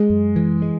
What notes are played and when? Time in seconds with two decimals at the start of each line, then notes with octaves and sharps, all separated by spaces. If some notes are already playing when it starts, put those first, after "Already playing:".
Already playing: G#3
0.10 F#2
0.36 E3
0.62 G#3